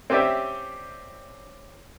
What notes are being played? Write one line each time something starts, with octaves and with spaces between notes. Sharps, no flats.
C4 C#4 G4 D5 E5 G5